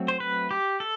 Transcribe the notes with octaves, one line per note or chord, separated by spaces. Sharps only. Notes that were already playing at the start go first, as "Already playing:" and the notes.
Already playing: F#3 A3 C4
C5
B4
G4
A4